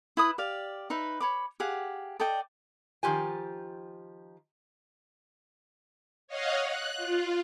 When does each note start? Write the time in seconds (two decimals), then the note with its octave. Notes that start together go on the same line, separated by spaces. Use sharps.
0.17 E4 B4 D#6
0.38 G4 D5 F5
0.90 D#4 B4 E5
1.21 C#5 B5 D6
1.60 G4 G#4 F5 F#5
2.20 A4 D5 D#5 G5
3.03 D#3 F3 G4 G#5
6.28 C#5 D#5 F5 F#5
6.63 F#6
6.97 F4